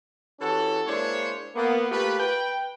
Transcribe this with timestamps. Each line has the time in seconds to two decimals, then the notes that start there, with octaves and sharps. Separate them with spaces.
0.40 E3 C#4 F#4 G4 A4
0.87 G#3 A#3 D4 E4 C5 C#5
1.56 A#3 B3
1.90 A3 A#3 F4 G4 B4
2.19 B4 G5